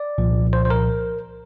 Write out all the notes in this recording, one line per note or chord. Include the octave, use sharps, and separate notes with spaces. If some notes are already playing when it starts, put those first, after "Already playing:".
Already playing: D5
C2 A#2 F3
C5
C5
A#4